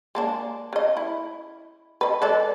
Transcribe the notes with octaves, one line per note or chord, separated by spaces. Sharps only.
G#3 A#3 D4
C#3 D#5
E4
B4 D#5
G#3 A4 D5